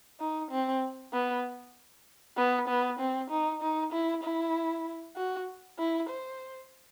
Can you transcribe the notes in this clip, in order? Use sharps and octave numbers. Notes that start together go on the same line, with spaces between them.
D#4
C4
B3
B3
B3
C4
D#4
D#4
E4
E4
F#4
E4
C5